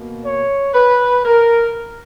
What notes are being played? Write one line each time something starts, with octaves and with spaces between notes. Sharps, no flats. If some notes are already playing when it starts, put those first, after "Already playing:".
Already playing: B2 A#3
C#5
B4
A#4